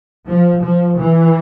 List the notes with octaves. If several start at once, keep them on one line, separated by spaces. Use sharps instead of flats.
F3
F3
E3